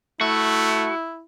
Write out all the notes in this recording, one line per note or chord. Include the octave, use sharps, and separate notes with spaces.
A3 E4 F#4